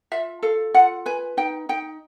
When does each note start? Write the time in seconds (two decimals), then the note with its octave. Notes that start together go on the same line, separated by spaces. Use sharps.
0.12 F4 E5
0.43 A4 F5
0.74 F4 F#5
1.06 B4 G#5
1.37 D#4 G5
1.69 D#4 G5